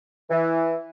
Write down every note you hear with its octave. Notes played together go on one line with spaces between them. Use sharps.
E3